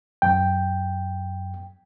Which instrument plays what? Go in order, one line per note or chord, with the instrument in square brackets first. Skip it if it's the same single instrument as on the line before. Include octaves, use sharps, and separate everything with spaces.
[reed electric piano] F#2 G5